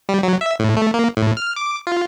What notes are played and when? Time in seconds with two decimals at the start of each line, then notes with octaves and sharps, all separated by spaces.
0.09 G3
0.23 F#3
0.41 E5
0.59 A2
0.77 A3
0.94 A#3
1.17 A2
1.37 F6
1.56 D6
1.87 F4